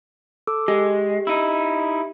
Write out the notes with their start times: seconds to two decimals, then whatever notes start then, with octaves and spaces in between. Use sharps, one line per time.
0.47 A4 D6 E6
0.68 G#3 G4
1.27 D#4 E4